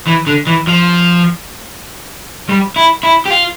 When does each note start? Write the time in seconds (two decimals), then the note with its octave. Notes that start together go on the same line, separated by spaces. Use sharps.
0.07 E3
0.27 D3
0.47 E3
0.67 F3
2.49 G3
2.76 E4
3.03 E4
3.26 G4
3.30 F4